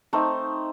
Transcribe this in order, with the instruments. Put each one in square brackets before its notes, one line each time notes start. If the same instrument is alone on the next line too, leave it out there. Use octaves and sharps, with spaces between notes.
[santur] A3 C4 D#4 C5